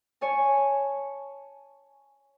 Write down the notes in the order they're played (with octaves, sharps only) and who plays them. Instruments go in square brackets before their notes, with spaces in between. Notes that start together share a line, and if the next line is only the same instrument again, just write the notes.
[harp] C#5 G#5 A5